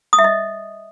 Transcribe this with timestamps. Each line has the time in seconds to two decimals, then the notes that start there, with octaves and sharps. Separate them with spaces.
0.13 D#6
0.19 E5
0.24 D#5